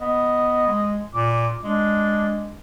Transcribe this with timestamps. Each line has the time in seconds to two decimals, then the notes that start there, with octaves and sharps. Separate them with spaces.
0.01 B3 D#5
0.67 G#3
1.14 A#2 D6
1.64 G#3 D4